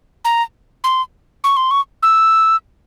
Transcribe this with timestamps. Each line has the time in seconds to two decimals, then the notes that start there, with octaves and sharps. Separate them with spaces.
0.24 A#5
0.84 C6
1.44 C#6
1.57 C6
1.71 C#6
2.03 E6